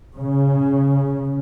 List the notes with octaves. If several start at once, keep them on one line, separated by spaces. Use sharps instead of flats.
C#3